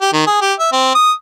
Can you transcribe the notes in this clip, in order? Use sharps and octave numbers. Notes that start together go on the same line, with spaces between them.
G4
D#3
G#4
G4
E5
C4
D#6